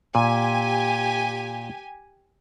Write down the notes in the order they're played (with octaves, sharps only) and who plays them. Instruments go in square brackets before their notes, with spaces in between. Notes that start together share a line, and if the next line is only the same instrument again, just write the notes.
[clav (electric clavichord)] A#2 [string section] G4 G#5